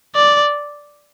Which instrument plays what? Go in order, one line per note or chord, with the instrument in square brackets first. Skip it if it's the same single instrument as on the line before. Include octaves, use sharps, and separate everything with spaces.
[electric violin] D5